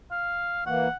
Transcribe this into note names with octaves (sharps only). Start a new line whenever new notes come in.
F5
E3 A#3 F#5